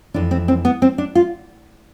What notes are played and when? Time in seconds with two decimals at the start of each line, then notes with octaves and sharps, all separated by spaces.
0.14 F2 E3 D4
0.31 C4
0.48 C4
0.65 B3
0.82 C4
0.98 D4
1.15 F4